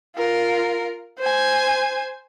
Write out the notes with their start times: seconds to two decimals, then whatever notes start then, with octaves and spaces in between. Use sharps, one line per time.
0.16 F4 A#4
1.19 C5 G#5